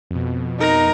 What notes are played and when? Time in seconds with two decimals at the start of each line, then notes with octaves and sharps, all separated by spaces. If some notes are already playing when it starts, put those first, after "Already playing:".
0.11 F2 B2
0.60 D#4 A#4 A#5